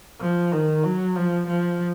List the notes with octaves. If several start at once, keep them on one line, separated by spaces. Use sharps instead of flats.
F3
D#3
F#3
F3
F3